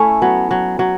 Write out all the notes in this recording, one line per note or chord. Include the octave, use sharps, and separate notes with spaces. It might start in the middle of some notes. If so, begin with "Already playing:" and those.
Already playing: A3 C#4 E4
F#3 B3
F#3
F#3